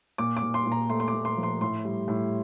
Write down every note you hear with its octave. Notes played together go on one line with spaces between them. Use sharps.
A#2 D6
D6
A#2
C6
A#2
A#5
A3 C6
C6
D6
A#2
C6
F3
C6
A2 C6
G3
A2